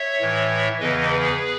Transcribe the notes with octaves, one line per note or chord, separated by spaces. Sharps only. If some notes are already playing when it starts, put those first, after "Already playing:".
Already playing: C#5 E5
A2 E3
E2 C#3 E3 B4 D#5
G#4 B4